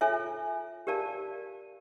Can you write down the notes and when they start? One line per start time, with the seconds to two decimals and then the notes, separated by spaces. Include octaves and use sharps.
0.01 F4 A4 C#5 E5 G#5
0.87 G4 A#4 D5 F5 A5